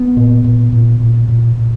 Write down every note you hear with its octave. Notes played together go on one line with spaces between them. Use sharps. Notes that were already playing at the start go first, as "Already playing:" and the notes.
Already playing: B3
A#2
A#2
A#2
A#2
A#2
A#2